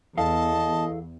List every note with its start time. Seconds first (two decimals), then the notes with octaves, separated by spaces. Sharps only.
0.18 E2 E4 A4 D#5 F5 A5